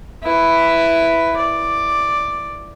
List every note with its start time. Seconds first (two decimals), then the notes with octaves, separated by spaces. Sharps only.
0.23 E4 B4
1.37 D5